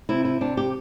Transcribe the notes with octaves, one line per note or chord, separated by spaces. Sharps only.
C3 E4
E4
C3 D4
G4